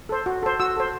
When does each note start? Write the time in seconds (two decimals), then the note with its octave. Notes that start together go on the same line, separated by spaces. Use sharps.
0.09 A4 C5
0.26 F#4
0.43 A4 C5
0.60 F#4 E6
0.77 A4 C5